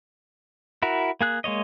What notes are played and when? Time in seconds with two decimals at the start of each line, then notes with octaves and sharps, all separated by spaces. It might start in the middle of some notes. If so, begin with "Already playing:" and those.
0.83 E4 F#4 A#4
1.21 A#3 G#4 F#6
1.44 G#3 A#3 C#5 D#5